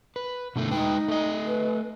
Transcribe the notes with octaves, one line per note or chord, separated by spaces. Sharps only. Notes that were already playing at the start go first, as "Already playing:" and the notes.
B4
B2 D3 A3
G#3 D#4 B4 G5
A3 D#5
B4